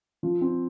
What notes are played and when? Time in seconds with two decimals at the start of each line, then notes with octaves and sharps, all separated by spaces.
0.23 F3 F4
0.41 C4